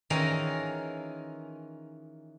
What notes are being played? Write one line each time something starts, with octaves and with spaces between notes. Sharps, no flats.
D#3 E3 C#4 F4 G#4 A#4